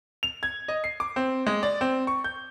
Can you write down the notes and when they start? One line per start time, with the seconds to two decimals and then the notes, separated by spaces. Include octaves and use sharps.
0.23 F7
0.43 G#6
0.68 D#5
0.84 C7
1.00 D6
1.16 C4
1.47 G#3
1.63 D5
1.81 C4
2.07 C#6
2.24 G6